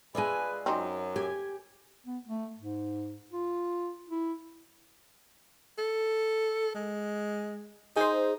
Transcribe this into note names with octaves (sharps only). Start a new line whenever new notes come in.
G#3 F4 G#4 B4 D5 E5 G#5
F#2 C4 D#4
G4 G#5
B3
A3
G#2
F4
E4
A4
G#3
D#4 G#4 C5